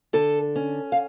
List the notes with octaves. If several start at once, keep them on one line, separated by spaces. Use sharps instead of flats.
D3 A4
C#4
F5